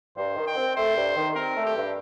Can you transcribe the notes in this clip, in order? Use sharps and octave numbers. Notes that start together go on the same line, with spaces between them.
G2 C5
D#3
G5
C4
A3 C5
G2
D#3
C4 A#4
A3
G4
G2